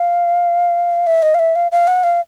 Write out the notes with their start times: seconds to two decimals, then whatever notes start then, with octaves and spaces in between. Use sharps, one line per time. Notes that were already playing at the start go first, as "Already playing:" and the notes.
Already playing: F5
1.07 E5
1.22 D#5
1.35 F5
1.39 E5
1.55 F5
1.72 F5
1.88 F#5
2.04 F5